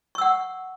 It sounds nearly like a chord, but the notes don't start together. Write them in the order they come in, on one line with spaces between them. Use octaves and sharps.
C#6 E6 F#5